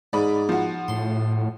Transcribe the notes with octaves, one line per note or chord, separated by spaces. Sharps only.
G#2 D5 B5 D#6
F3 F#4
A2 C6